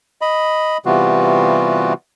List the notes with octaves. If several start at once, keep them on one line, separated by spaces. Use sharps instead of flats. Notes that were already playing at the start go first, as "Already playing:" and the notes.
D#5 B5
C3 E3 G3 B3 F4 F#4